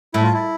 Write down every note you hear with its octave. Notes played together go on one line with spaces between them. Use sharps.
A2 E4
F4
E4